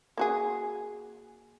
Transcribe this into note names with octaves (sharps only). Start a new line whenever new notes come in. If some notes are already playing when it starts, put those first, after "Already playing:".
A#3 F#4 G#4